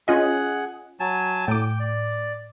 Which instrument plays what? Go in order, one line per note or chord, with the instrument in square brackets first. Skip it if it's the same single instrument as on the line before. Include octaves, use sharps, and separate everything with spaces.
[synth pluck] C#4 F4 D#5 [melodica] G#4 F#5
[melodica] F#3 G#5 A5
[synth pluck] A2 D6 [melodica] G5
[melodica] D5